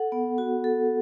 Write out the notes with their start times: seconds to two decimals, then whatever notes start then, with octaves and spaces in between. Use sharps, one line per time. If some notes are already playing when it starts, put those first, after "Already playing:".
Already playing: A4 F#5
0.12 B3
0.38 F#4
0.64 A4